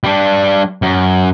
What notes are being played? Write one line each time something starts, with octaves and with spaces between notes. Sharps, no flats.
G3 D4
F#2